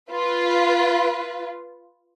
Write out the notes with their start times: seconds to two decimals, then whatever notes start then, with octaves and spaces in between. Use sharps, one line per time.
0.11 F4 B4